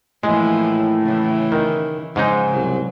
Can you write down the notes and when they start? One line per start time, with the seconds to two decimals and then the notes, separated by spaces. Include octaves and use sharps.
0.23 A2 E3 F3 G#3 A#3
1.02 C#3 E3
1.52 D#3
2.16 G#2 C#3 F3 G#3 D#4
2.52 C2 F#3